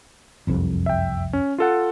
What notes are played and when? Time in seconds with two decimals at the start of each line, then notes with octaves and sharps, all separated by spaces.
0.47 F#1 C2 F2
0.86 E5 G5
1.33 C#4
1.58 F4 A4 F#5